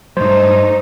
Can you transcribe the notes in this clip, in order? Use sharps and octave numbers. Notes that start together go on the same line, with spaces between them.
G2 F#3 A3 D#4 C5